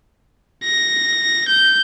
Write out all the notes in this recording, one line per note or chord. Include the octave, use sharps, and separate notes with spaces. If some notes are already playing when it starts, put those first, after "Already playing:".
A#6
G6